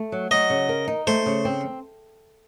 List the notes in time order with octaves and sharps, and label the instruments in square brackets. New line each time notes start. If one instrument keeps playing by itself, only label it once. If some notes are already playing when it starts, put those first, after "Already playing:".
Already playing: [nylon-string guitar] A3
F#3
[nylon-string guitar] F#3 [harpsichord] D#5
[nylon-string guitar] C#3
A#4
D#4
[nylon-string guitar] A3 [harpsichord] C5
[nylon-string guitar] C#3
C4